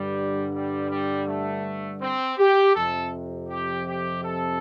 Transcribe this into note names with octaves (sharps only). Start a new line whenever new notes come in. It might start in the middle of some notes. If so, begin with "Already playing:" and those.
Already playing: G2 D3 G3
G3
G3
A3
C4
G4
F2 C3 A4
G4
G4
A4